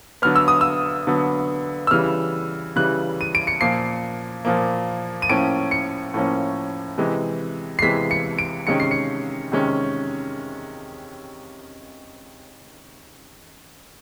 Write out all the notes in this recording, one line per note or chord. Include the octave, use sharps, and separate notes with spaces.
D3 F#3 B3 F6
E6
D#6
E6
D3 F#3 B3
E6
C#3 E3 G3 F6
C#3 E3 G3 F#6
D#7
D7
C#7
A#2 F3 A#3 C7
A#2 F3 A#3
D#7
A2 F3 A#3 C#4 D7
C#7
A2 F3 A#3 C#4
C3 E3 G#3
C7
C3 E3 G#3 B6
C#7
D7
C3 D#3 G#3 C#4 C#7
C7
C#7
C3 D#3 G#3 C#4